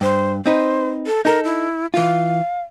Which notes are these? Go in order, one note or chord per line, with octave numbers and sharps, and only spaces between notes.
G2 C5
C4 D#4 B4 C5
A4
D#4 A4 A#4
E4
E3 F4 F5